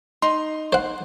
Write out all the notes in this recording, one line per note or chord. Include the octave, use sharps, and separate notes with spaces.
D#4 C6
C5 F#5